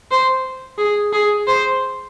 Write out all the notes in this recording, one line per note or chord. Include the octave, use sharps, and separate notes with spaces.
C5
G#4
G#4
C5